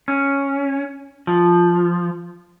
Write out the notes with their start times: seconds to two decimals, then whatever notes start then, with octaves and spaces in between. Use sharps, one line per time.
0.08 C#4
1.27 F3